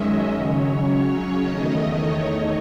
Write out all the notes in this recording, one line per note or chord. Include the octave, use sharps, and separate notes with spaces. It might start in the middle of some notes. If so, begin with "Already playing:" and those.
Already playing: F#2 D#3 G#3 C#4 D#5 E5
C#3 F#3 C#4 C#5
E2 D#3 A3 D#5
C#5